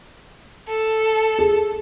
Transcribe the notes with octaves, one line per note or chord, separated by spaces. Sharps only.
A4
G#4